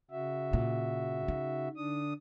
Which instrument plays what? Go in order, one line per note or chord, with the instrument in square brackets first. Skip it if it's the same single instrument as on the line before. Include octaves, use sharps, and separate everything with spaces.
[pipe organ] C#3 F#4 E5
[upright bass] A#2
D#4
[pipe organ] D3 D4 D#6